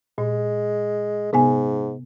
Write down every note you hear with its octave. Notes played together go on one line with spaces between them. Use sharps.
A#2 G#3
G#2 C3 B3 G#5